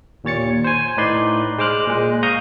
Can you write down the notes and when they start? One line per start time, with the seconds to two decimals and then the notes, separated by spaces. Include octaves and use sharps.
0.24 D#2 A#2 C#5 A6 C#7
0.64 C5 G#5
0.97 A2 D#4 B4 D5 C6
1.58 G#3 C5 D6 F6 F#6
1.88 A#2 G#3
2.23 F5 A#5 C#6 D#6 G6